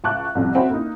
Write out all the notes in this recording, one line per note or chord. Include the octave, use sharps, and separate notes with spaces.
C#2 E5 A5 C#6 D6 F#6
C2 F2 C3
C4 F#4 E5 F#5 G#5 B5
A#3 D#4